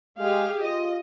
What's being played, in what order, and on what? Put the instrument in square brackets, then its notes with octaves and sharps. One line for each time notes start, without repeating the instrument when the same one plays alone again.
[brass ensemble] G#3 [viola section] G4 G#4 F5
[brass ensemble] F4 [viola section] D#5